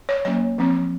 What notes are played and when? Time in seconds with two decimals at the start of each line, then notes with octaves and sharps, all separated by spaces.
0.09 C#5
0.25 F#3 A#3 C#4 C#5
0.58 F3 C4